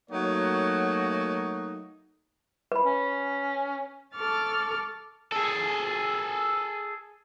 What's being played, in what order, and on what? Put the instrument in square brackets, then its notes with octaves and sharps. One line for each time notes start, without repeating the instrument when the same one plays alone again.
[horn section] F#3 A3 A#3 D#4 F#4 C#5
[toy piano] B4 B5
[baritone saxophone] C#4
[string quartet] A4 C#6 D6 F6 A6
[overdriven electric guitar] G#4 A4